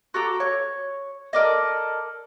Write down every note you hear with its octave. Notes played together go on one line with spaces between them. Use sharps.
F#4 A4 A#5 D6
C#5
A4 A#4 D5 D#5